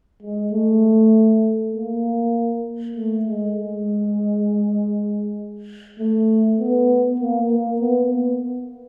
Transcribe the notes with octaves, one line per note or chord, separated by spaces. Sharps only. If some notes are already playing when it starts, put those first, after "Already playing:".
G#3
A3
A#3
A3
G#3
G#3
A3
B3
A#3
A#3
B3
B3